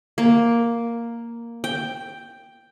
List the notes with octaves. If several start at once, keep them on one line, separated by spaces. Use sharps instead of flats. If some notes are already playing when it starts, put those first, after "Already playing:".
A#3
G5